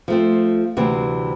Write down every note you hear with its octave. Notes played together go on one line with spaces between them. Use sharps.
F3 A3 C4
D2 C3 E3 G3 C4